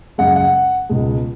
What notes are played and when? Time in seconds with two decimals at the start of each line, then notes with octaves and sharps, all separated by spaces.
0.18 F#2 C#3 G#3 F#5
0.36 F#5
0.89 C#2 B2 G#3